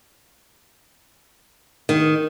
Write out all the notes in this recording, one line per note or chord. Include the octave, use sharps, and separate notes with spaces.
D#3